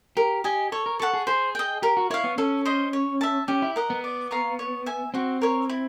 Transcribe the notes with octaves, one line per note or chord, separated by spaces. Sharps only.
G4 A#4
G4 D#5 G#5
A4 C#5
A#4
A4 F#5 A5 C#6
G#4
G#4 C5
D#5 G5
G4 A#4
F#4
E4 C#5 F5
B3
C#4 A4
C5 D#5
C#5
E5 A5
C#4 G4
E4
A#4 D#5 F#5
B3
D5
F5 A#5 C#6
C#5
E5 G#5
C4 F#4
A#4 C#5
E4